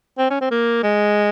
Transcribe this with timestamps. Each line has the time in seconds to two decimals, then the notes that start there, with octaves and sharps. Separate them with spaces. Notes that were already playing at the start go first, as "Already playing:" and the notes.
0.18 C4
0.30 C#4
0.41 C4
0.51 A#3
0.83 G#3